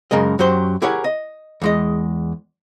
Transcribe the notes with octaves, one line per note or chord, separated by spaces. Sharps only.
F#2 C#3 G#3 A#4 D#5
F#2 F#3 G4 C5 C6
E4 G4 G#4 A#4 C#5 F#5
D#5
E2 G#3 D#5